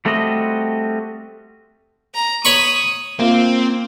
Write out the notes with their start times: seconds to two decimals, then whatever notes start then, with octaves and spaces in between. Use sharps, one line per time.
0.05 G3 A3 C4 F#4 D#5
2.14 A#5
2.45 C#5 B5 C#6 D#6
3.19 A#3 C4 F4